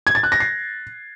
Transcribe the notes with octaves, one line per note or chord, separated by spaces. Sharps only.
G#6
A6
F#6
A#6
C7